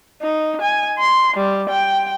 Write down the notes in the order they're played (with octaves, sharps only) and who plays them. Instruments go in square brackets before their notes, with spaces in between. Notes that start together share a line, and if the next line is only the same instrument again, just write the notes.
[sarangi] D#4
G#5
C6
G3
G5